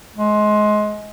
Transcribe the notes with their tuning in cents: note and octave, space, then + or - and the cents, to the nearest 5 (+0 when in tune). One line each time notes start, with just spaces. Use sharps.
G#3 +25